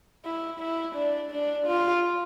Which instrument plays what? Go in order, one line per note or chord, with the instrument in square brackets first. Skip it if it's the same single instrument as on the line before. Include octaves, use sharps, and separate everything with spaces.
[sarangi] E4
E4
D4
D4
F4